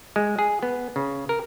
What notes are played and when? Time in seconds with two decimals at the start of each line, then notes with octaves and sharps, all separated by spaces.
0.16 G#3
0.39 G#4
0.63 B3
0.96 C#3
1.29 A#4